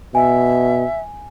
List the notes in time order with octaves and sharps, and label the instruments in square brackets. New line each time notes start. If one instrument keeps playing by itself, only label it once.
[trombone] B2 [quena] E5 [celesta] G#5